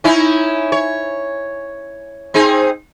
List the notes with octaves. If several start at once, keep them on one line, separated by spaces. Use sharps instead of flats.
C#4 D#4 E4
C#5
C4 D#4 G#4